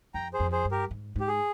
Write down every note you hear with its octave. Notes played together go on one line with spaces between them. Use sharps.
F2 G5 A#5
G#4 C5
F2
G#4 C5
G2
G4 A#4
G#2
G#2 G4
G#4